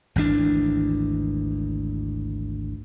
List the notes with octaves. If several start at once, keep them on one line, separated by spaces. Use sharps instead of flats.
G#1 D2 E3 D4